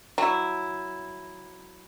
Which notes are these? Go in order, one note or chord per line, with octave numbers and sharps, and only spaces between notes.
F#3 E4